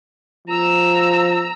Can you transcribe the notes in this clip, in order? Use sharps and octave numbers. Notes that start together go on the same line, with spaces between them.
F3 A#5 E6